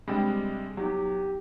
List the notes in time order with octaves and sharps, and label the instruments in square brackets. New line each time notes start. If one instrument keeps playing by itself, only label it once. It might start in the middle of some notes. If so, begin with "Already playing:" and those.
[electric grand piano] C3 G3 G#3 [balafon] D4 G5
[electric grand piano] F#3 [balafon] B3 D#4 [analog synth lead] G4